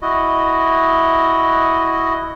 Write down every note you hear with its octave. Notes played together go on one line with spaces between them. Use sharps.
E4 F#4 D#5